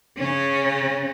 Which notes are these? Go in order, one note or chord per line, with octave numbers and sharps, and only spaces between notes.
C#3 C#4